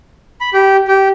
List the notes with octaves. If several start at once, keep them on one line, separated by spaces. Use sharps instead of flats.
B5
G4
G4